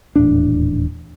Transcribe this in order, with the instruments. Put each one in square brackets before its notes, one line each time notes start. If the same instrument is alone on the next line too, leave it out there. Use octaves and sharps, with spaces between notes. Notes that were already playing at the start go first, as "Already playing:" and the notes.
[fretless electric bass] D#1 E2 A2 D4